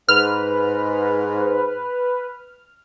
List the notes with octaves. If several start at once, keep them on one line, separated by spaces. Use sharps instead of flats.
G#2 B4 F6